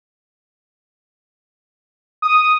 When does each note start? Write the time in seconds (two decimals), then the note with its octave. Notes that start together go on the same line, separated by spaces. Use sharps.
2.22 D#6